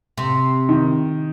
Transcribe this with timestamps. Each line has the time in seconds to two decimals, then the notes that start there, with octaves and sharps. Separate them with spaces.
0.17 C3
0.69 D#3